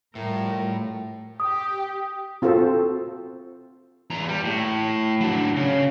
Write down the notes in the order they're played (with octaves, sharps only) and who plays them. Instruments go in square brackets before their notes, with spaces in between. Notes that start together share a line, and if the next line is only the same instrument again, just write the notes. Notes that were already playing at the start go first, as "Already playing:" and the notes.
[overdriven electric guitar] A2 [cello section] F3 G3 A#4
[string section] G4 [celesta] D#6
[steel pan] C4 F4 F#4 A4 C5
[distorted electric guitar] E2 A#5
G3
A2
F#3 D4
C#3